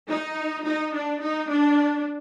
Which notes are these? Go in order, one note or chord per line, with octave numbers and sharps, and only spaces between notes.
D#4
D#4
D4
D#4
D4